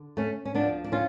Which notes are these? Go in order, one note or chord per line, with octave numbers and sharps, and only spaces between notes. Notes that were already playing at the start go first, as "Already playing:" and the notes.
Already playing: D3
A3 C#4
C#4
D2 D3 F3 B3 D4
D4
C#4 F4